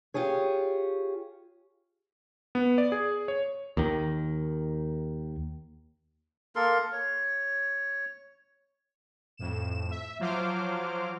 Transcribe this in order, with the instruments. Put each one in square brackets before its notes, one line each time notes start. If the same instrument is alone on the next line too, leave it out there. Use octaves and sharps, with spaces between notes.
[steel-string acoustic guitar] F4 G4 G#4 C#5
[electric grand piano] B3
D5
G#4
C#5
[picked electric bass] D#2 D#3
[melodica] A#3 A4 A#4 C6
C#5
[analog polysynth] F2 A2 E7
E5
F3 F#3 F4 C5 D6 F6